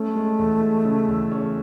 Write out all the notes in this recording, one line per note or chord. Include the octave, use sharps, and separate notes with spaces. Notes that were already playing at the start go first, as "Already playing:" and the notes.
Already playing: A3 C#4
G#3
E2
G#3
C#3
E2
C#4